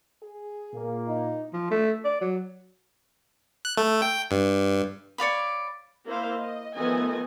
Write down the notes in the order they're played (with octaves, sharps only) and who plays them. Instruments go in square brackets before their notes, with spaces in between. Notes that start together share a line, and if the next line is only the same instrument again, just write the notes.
[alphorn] G#4
[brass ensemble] A#2 A#3
[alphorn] D#4
[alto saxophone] F3
A3
D5
F#3
[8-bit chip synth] F#6
A3
G5
G2
[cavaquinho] C#5 D5 F5 B5
[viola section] A#3 E4 C5 F5
D#5
D#3 F3 A3 B3 D#5 G#5